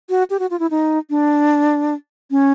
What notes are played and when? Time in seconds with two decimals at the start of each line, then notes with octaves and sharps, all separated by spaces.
0.09 F#4
0.30 G4
0.39 F#4
0.51 F4
0.60 E4
0.71 D#4
1.10 D4
2.31 C#4